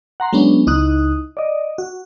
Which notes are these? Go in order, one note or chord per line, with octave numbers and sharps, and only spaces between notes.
F#5 A#5 C6
F#3 G#3 B3 C#4 D4
C#2 D#4 E4 D#6 F#6
D5 D#5
F#4